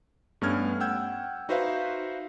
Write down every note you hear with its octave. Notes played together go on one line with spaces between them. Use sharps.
G2 A3 B3 C#4 F6 G#6
F#5 G5 E6 G6 G#6
D#4 F#4 B4 C5 E5 F5